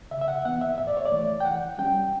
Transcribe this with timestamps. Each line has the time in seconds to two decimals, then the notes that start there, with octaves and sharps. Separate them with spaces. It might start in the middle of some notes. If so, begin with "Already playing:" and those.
0.11 C#3 E5
0.21 E5
0.28 F#5
0.45 E3 B3 F#5
0.61 E5
0.78 A2 E5
0.87 D5
0.97 C#5
1.05 D5
1.12 E3 A3
1.40 G5
1.45 E3 F#5
1.78 G3 C#4 G5